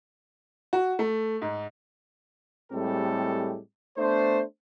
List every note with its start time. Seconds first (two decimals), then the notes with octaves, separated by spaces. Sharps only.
0.73 F#4
0.99 A3
1.42 G#2
2.72 A2 G3 G#3 C4 G4 A4
3.97 A3 B3 D4 C5